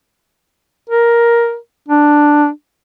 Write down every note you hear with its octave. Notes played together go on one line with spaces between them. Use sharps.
A#4
D4